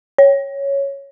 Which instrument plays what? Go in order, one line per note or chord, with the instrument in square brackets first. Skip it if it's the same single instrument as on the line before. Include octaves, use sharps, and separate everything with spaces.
[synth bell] C#5